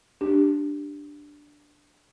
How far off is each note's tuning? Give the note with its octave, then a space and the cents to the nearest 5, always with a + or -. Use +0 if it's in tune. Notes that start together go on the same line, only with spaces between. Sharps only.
D4 +0 G4 +0